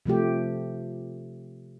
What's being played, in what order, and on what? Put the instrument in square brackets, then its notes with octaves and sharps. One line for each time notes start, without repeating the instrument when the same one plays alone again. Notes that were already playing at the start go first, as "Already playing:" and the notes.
[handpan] C3 F3 A3 G4